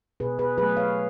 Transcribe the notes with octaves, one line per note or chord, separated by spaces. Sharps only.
B2 G#4 B4
G#4 B4
F#3 A3 G#4 B4
C#5 F5